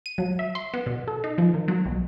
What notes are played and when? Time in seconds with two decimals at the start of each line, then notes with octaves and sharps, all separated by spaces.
0.06 D#7
0.18 F#3
0.39 E5
0.55 C6
0.74 B3
0.86 B2
1.08 A4
1.24 D#4
1.38 F3
1.54 D#3
1.68 F#3
1.86 B1